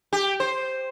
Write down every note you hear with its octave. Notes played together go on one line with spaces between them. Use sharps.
G4
C5